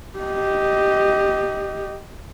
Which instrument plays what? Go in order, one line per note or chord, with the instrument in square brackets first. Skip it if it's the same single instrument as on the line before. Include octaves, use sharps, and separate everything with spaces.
[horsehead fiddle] G4 D#5